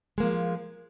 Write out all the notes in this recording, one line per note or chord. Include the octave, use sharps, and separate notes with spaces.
F3 G#3 A#3